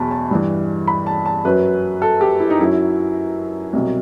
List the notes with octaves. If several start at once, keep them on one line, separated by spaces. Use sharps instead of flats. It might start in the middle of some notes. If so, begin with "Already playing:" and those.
Already playing: E2 B2 F#3 A5 B5
A5
G2 E3
B5
A5
A5
F#2 F#3 B4
A4
G4
E4
D#4
F#2 F#3 E4
C2 B2 F#3